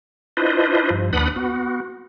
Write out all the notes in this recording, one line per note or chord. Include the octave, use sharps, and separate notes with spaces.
D4 E4 F4 B4 C5 D#5
G2 F3
D#2 D4 B4 F#5 B5 D#6
B3 F#4